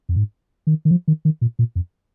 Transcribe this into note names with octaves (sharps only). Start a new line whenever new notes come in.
F2
G#2
D#3
D#3
F3
D#3
D#3
A#2
A#2
F2